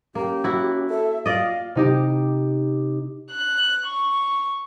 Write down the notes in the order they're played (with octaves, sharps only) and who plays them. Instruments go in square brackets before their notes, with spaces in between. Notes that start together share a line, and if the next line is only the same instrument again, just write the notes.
[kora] A#3 [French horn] C#4 [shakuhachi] G4
[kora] E4 F#4
[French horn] A4 [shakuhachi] E5
[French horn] F4 [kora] D5 D#5 [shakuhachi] F5
[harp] C3 D#4 G4
[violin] F#6
C#6